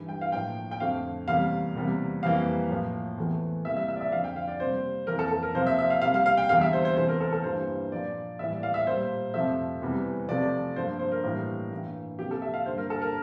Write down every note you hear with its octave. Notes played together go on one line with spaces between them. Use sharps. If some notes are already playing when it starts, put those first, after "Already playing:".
Already playing: G2 E3 G3
G5
F5
A2 F3 A#3 G5
G5
F2 D3 A3 F5
E2 C3 G3 A#3 F5
E2 C3 G3 A#3
F2 E3 G3 A#3 F5
A2 F3 A#3
E2 E3 A3
C3 E3 G3 A#3 E5
E5
E5
D5
E5
F2 D3 F3 F5
G5
F5
D5
C3 G3 A#3 C5
F2 E3 A#3 A#4
A4
A4
A#4
C3 F3 A#3 C5
E5
E5
F5
C3 G3 A#3 F5
F5
F5
G5
E2 D3 G3 A#3 F5
E5
C5
C5
E2 C3 E3 A3 C5
A#4
A4
A4
G2 E3 G3 A#3 C5
A#2 F3 A#3 D5
A2 E3 G3 A#3 E5
D5
F5
E5
A#2 G3 A#3 C5
F2 C3 F3 A3 E5
E2 C3 E3 G3
C3 F3 A3 D5
G2 F3 A#3 C5
C5
A#4
A2 E3 G3 A#3
G2 E3 A#3
C3 F3 A#3 G4
A4
E5
F5
G2 D3 G3 A#3 C5
A#4
A4
A#4